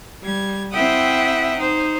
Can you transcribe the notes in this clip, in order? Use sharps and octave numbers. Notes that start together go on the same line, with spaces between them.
G3 G#6
C4 E4 E5 F#5 G5 D#6
D#4 C5